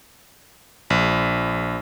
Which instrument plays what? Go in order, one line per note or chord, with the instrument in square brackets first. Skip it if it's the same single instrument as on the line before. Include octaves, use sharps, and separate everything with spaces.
[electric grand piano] A#1